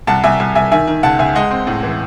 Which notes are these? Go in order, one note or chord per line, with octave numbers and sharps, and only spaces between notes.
C2 F#5 A5
C2 E5 G#5
C2
C2 E5 G#5
D#3 E5 G#5
D#3
C#2 F#5 A5
C#2 E5 G#5
G#3 D#5 F#5
C4
A2
E3